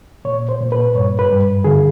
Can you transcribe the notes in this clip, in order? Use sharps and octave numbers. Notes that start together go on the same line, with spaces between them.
A#2 C#5
C5
A#2
B4
G2 C#5
B4
G2
D3 G#4